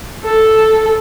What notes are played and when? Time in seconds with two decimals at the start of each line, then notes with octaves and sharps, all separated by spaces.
0.24 A4